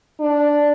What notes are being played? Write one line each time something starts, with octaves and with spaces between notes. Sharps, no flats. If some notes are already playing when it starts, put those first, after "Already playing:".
D4